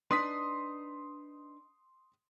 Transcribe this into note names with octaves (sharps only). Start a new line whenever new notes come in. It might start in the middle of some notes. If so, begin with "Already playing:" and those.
D4 D#4 B4 C6 D#6 B6